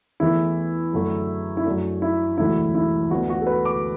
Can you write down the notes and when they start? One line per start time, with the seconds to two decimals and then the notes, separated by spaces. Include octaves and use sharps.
0.20 E2 E3 A3 E4
0.93 F#2 D3 F#3 A3
1.57 E4
1.66 F#2 F#3 A3 D4
2.02 E4
2.38 E1 D2 D3 F#3 A3 E4
2.75 E4
3.10 D2 D3 B3 F#4
3.30 F#4
3.41 A4
3.47 B4
3.65 D6